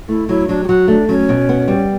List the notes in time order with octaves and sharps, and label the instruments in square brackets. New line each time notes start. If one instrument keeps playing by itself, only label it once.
[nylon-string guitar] A3 [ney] E4
[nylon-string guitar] F#3 [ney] E4
[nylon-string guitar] F#3 [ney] D4
[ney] G4
[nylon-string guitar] F#3 [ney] F#4
[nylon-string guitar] A3 [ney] D4
[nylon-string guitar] F#3 [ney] C#4
[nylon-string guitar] B2
B3
G3